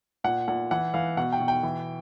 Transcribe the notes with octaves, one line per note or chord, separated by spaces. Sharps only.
A#2 F#5
A#2 F#5
E3 F#5
E3 F5
B2 F#5
G5
B2
G5
E3